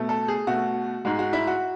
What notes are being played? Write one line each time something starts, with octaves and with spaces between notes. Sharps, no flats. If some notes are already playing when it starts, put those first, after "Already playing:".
Already playing: B2 A3
A4
G#4
B2 A3 F#4
G#2 G#3 F#4
F#4
E4
F#4